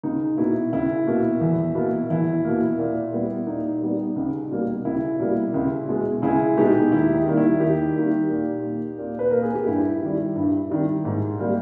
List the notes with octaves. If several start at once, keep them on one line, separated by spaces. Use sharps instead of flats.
C#2 D#4
B2 A#3 E4
C#2 E4
B2 A#3
E2
B2 A#3
E2 E4
B2 A#3
A#2
G3 B3
A#2 D#4
G3 B3
C#2
B2 G3 A#3
C#2 E4
B2 G3 A#3
C#2
B2 G#3
C#2 E4 G#4
B2 G#3 D#4 G4
D#2 E4
D#4
D#3 G3 A#3
E4
D#2 D#4 G4
D#3 G3 A#3
A#2
A#3
A#2
B4
A#3 A#4
G#4
G4
G2 E4
D#3 G3
G2
D#3 G3
G#2
G3 A#3